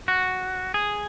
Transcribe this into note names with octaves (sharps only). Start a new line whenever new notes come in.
F#4
G#4